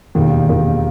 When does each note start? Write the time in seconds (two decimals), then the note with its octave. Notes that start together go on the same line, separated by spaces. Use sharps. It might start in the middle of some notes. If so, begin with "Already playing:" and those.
0.15 E1 D#2 D#3
0.48 E1 D#2 D#3